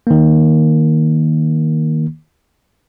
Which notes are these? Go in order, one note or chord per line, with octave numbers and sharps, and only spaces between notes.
D#3 A#3